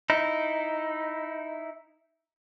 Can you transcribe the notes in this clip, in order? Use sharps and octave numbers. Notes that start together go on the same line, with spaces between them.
D#4 E4